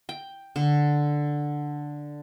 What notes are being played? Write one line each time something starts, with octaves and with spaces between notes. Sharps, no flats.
G5
D3